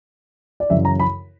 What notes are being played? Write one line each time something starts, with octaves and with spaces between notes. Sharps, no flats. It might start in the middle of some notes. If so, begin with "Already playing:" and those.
D5
F#2 C#3 E3 E5
A#5
B5